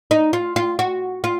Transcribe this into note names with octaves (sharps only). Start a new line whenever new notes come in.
D#4
F4
F4
F#4
F4